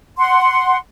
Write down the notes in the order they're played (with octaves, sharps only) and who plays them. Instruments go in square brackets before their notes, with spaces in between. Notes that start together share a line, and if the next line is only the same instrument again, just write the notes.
[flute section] F#5 C6